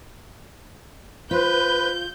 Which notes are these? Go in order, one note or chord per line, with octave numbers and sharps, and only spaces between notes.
F4 B4 C5 G6